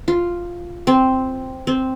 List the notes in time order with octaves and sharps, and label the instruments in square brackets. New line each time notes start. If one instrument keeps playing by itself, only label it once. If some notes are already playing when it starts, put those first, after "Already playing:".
[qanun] F4
C4
C4